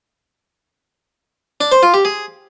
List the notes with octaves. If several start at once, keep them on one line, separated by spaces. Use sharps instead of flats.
D4
C5
F4
G4
G#4